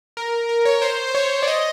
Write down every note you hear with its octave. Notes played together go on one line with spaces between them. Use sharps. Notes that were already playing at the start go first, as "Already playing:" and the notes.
A#4
A#4
C#5
C5
C5
C#5
D5
D#5